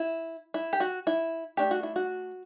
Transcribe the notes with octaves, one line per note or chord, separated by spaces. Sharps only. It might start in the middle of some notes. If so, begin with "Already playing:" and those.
Already playing: E4
E4
G4
F#4
E4
A3 D4 G4
F#4
E4
F#4